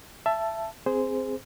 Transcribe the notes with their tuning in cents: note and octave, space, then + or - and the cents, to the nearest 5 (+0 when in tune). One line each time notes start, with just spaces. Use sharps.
E5 +20 A5 +0
C4 +0 G#4 +0 C5 -15